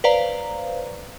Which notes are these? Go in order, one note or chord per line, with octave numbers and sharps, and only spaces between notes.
B4 C5 D5 F5 A#5